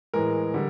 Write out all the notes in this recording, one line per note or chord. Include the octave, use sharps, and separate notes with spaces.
A2 E3 G#3 A#4
D3 G3